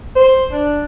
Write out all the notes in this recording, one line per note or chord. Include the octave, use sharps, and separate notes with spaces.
C5
D4